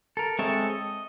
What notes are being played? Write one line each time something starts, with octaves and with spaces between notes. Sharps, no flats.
A4 A#4
G#3 C4 A4 C#5 E5
D#5